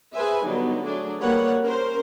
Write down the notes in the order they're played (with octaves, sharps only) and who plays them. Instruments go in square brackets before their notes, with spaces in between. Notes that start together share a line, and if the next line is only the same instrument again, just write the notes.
[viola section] G#4 B4 C5 E5 G#5
D3 F#3 G3 B3 D#4
F#3 A3 D4 G#4
G3 A#3 B4 C#5 F#5
C#4 A#4 C5